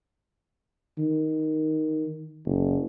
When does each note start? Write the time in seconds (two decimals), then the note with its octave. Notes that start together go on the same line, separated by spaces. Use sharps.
0.98 D#3
2.46 F#1